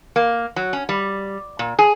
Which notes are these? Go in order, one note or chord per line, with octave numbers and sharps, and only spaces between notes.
A#3
F#3
C#4
G3
A#2
G#4